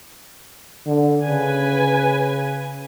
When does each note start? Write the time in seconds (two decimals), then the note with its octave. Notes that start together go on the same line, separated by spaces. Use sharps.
0.87 D3
1.26 C#3 B4 G#5